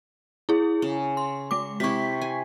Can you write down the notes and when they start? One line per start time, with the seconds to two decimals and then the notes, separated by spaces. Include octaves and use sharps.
0.49 E4 G#4
0.82 C#3
1.17 C6
1.51 G#3 D6
1.80 C3 E4 C#6 B6
2.22 G#5